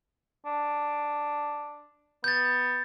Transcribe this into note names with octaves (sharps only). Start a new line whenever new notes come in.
D4
B3 G6 A6